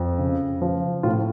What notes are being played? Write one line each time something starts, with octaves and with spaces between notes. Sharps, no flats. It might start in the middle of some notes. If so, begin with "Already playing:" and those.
Already playing: F2
C#3
F3
A2 F4